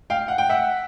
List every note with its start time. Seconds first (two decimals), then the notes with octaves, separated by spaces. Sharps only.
0.10 F5 G5
0.28 F#5
0.38 G5
0.50 E5 F#5